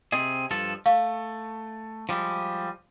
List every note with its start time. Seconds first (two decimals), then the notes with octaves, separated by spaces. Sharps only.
0.12 C3 C4 G#4 D#5
0.51 G2 F3 A4
0.86 A3 F5
2.09 F3 G3 G#3